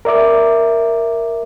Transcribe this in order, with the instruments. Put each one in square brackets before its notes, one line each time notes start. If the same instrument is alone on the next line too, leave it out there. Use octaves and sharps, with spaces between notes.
[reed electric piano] A#4 D5 E5 D6